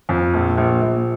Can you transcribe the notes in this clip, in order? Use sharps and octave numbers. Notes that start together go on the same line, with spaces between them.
F2
A#1
A#1
A#1